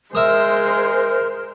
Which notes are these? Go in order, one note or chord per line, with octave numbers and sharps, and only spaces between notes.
G#3 A#4 C5 E5 D#6